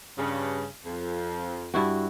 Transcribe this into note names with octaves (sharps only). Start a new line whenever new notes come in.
G2 C#3
F2
G2 E4 F#4